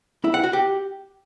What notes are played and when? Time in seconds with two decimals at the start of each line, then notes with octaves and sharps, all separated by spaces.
0.24 E4
0.34 F#5
0.44 F#4
0.53 G4